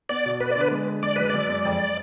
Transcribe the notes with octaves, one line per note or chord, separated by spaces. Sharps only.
B3 D5
B2
B3 B4
D3 D5
B4
G#3
D3
G#3 D5
F#2 B4
F#2 D5
G#3
F2